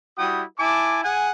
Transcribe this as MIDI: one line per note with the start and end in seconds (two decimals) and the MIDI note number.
0.18 0.43 55
0.18 0.43 64
0.18 0.43 66
0.18 0.43 79
0.18 0.43 87
0.59 1.02 64
0.59 1.02 80
0.59 1.02 81
0.59 1.02 86
1.03 1.32 68
1.03 1.32 78
1.03 1.32 80